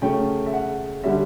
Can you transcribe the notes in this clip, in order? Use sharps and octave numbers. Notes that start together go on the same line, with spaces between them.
C#3 F#3 A3 C#4 G5
E5
F#5
D3 G3 C#4 E5